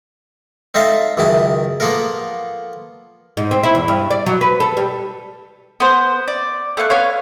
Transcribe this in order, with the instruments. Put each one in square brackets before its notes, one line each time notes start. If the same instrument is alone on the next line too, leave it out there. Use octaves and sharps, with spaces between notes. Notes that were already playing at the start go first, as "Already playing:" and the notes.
[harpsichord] C4 D#4 A4 E5 F5 A5
C#2 F#2 D#3 E4 A5
F3 A#3 B3 F4 A4 A#4
[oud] G#2
C4
E4
E2
G2
D5
F#3
B4
A4
G3
[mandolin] B3 C5
D5
A3 A#3 C#6 F#6
B3 C#5 F5